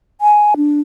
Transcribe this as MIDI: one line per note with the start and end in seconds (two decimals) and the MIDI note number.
0.21 0.54 80
0.57 0.81 62